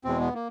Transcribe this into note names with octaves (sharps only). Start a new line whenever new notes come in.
E2 B2 G#3 C4
B3
A#3